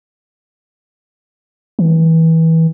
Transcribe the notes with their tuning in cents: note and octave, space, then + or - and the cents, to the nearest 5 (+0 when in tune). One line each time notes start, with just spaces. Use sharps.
E3 -25